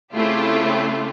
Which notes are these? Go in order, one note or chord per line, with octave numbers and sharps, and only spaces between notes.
C#3 A3 C4 E4 F4 G4